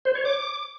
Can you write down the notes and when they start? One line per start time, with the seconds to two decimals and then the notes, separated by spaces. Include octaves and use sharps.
0.05 C5
0.15 C#5
0.25 D6